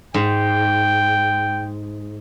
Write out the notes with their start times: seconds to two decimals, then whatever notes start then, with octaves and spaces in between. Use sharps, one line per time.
0.14 G#2 G5